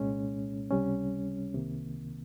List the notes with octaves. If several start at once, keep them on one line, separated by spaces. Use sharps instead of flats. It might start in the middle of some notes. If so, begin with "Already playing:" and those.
Already playing: C2 A#2 G#3 C#4
C#2 C3 G3 C#4
C2 C3 D#3 A#3